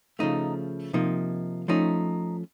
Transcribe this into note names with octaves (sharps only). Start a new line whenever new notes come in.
C#3 F3 A3 D#4
C3 F3 A#3 D#4
F3 A3 C#4 D#4